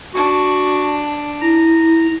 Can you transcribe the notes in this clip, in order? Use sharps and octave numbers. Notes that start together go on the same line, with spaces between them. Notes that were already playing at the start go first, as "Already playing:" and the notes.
D4 F#4
E4 A#5